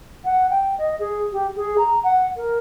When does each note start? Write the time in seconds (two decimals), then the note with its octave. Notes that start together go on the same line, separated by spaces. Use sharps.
0.25 F#5
0.50 G5
0.78 D#5
0.99 G#4
1.32 G4
1.56 G#4
1.78 A#5
2.04 F#5
2.36 A#4